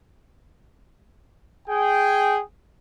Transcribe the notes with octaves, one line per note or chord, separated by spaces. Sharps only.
G#4 G5